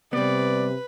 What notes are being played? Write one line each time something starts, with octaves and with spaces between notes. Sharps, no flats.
C3 G3 B3 B4 D5